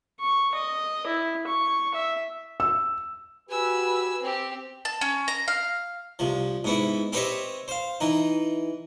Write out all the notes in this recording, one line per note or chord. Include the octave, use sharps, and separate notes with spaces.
C#6
D#5
E4
C#6
E5
E6
F#4 G4 B4 G#5 E6
C4 G4
A5
C#4
A#5
F5
C2 F3
G#2 B3 E4
C4 G4 B4 C#5 D#5 E5
C5 F5
E3 D#4